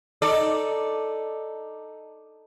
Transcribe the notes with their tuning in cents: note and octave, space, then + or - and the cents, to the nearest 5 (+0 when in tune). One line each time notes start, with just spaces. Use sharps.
D#4 +0 A4 +0 D5 +0